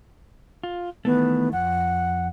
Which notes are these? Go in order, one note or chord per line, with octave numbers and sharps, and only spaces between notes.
F4
D#3 E3 A3 B3
F2 F#5